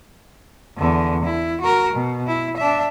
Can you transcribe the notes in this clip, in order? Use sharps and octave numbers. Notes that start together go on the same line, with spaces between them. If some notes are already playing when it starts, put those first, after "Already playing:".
E2 D3
E4
F#4 A#4
B2
E4
D4 E5